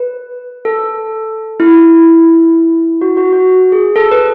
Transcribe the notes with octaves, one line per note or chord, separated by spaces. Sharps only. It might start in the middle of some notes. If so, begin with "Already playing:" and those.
Already playing: B4
A4
E4
F#4
F#4
F#4
G#4
A4
B4